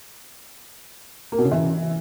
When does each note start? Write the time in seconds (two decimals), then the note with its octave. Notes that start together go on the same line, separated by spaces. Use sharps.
1.32 A#3
1.39 B2
1.45 C#3
1.51 E3